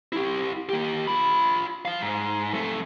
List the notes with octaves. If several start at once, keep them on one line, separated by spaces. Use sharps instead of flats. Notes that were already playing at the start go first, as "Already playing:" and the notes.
E4 G4
A#3 G4
F4 B5
F3 F5
G#2
F2 A3